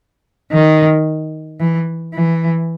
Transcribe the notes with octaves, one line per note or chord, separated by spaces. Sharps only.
D#3
E3
E3